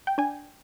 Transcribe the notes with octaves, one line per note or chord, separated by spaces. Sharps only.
G5
D4 G#5